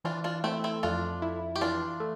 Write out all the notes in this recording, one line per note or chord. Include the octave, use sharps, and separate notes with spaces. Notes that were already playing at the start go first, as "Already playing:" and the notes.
E3 D4 F4
D4 F4
A3 C4 E4
C4 E4
F2 D4 F4
E4
G4
E3 D4 F4
A3